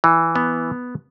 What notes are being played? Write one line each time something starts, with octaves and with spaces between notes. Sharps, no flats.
E3
B3